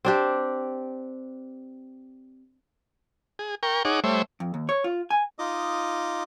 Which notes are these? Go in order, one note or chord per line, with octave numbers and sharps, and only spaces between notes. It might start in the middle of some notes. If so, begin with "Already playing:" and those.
C4 D4 G4
G#4
A#4 G5 C#6
D#4 G#4 C#5 F#5 D6
G3 A3 C5 C#5 E5
F2
D#2
C#5
F4
G#5
D#4 F4 D#5 D6 D#6